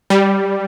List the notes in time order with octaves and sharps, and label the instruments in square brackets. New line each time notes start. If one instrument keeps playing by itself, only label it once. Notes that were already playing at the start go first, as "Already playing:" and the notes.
[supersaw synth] G3